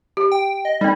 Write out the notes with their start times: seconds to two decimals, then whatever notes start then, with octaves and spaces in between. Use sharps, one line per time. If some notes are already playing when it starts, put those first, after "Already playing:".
0.17 G4
0.32 G5
0.65 D#5
0.81 G3 C4 D#4